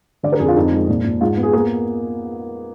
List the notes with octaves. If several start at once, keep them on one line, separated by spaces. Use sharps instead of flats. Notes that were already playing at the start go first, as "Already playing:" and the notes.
D3 D5
A#4
F2 G#4
F4
F2 D#4
G#3
A#2
A#2
G#2 F4
B3
G#4
A#3 G#4